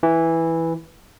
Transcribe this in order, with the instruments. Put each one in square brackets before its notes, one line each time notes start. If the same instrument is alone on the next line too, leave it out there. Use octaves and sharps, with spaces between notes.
[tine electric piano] E3